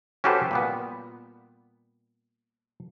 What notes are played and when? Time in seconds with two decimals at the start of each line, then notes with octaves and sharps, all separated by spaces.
0.24 C#4 F#4 G4 A4 B4 C5
0.51 A#2 G3 B3